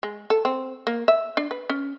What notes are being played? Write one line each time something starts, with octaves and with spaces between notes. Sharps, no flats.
G#3
A4
C4
A#3
E5
D4
B4
C#4